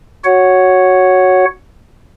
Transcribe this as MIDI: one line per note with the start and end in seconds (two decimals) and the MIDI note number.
0.25 1.45 66
0.25 1.45 73
0.25 1.45 78